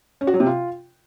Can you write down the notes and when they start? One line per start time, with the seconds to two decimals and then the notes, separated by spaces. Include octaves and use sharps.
0.21 C#4
0.27 F#4
0.34 F#3
0.40 C3
0.46 F4